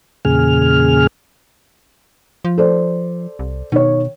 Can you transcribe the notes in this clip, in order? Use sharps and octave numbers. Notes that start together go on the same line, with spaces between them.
E2 A#2 C#3 G#4 F6
F3
A4 C5 D5
C2
B2 D#3 C#5